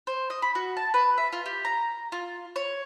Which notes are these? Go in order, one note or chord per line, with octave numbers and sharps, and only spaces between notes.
C5
D#5
B5
F#4
A5
B4
E5
F4
G4
A#5
F4
C#5